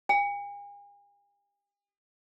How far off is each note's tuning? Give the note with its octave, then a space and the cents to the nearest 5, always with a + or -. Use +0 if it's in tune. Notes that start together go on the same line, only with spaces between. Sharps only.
G#5 -45